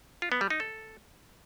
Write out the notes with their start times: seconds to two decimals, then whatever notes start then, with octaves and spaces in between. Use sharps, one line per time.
0.22 F4
0.32 B3
0.41 G3
0.50 D#4
0.60 A4